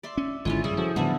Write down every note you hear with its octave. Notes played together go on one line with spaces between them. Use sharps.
D5 E5 C6
C#4
G#1 D3 G#3 C#4 E4 F4 G#5
G#1 F#2 C#3 G3 G#4
F3 C#4 F#4 A4
A2 D3 E3 F3 G3 A3 B3 E5